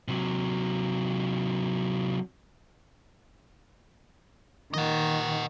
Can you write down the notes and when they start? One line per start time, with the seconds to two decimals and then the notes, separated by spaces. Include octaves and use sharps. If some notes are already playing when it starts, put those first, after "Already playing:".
0.08 C3 F#3
4.74 D#3 D#5 F#5